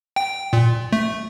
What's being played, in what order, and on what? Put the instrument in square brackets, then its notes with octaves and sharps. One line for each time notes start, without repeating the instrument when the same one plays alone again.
[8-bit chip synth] G5
A#2
A3